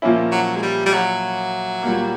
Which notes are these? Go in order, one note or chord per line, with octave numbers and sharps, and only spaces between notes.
A#2 F3 A#3 C#4 E4
F#3
G#3
G3
G3
F#3
A#2 G3 A#3